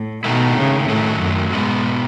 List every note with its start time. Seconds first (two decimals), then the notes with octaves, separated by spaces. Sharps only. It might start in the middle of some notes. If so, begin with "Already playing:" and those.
Already playing: A2
0.24 G#2 B2 D#3 A3 E4
0.57 C#3
0.88 A2 D#3 F#3 A3 C#4
1.20 F#2
1.52 G#2 B2 G#3 B3